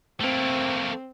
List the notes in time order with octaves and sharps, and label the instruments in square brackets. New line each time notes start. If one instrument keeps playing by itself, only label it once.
[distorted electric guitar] A3 A#3 [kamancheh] C4